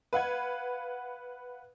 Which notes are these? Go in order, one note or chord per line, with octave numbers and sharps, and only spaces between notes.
B4 F5 F#5 G#6